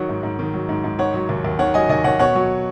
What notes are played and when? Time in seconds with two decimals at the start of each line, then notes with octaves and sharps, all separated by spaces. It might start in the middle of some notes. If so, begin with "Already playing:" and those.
Already playing: D#3 F#3 C#5 F#5
0.09 G#2
0.23 G#2
0.39 D#3
0.54 F#3
0.69 G#2
0.84 G#2
0.99 D#3 C#5 F#5
1.14 F#3
1.29 D#2
1.45 D#2
1.59 D#3 C#5 F#5
1.74 F#3 D#5 G#5
1.89 D#2 D#5 G#5
2.04 D#2 C#5 F#5
2.19 B2 C#5 F#5
2.35 F#3